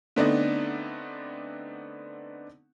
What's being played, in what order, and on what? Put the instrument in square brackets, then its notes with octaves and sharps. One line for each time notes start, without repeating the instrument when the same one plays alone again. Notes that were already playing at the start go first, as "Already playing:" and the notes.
[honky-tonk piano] D3 A3 B3 C4 D4 D#4